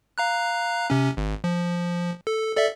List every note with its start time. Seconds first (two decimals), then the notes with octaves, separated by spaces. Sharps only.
0.18 F5 A#5 F#6
0.90 C3 C#4
1.17 G#1
1.44 F3
2.27 A4
2.56 A4 D5 E5